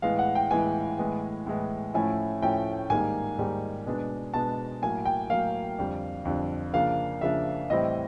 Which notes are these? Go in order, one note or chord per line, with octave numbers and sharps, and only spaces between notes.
A2 E3 G#3 B3 F5
F#5
G5
A2 E3 G#3 B3 G#5
A2 E3 G#3 B3
A2 E3 G#3 B3
A2 F3 A3 C#4 E4 G#5
A2 F3 A3 C#4 E4 G5
G#2 D#3 G3 A#3 D#4 G#5
G#2 D#3 G3 A#3 D#4
B2 G#3 B3 D4
B2 G#3 B3 D4 A5
A2 F#3 A#3 G#5
G5
A2 F#3 A#3 F5
F2 D3 G3
F2 D3 G3
C#3 F3 A#3 D4 F5
C#3 F3 A#3 D4 E5
A2 E3 G3 C4 E4 D#5